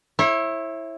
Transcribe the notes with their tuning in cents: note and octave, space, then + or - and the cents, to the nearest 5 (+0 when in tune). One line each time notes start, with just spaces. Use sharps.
E4 +0 C#5 -40